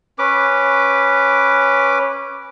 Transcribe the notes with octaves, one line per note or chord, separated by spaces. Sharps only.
C#4 B4 D6